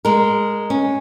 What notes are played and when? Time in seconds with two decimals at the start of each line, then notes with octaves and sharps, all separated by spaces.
0.05 G#3 A#4
0.70 C#4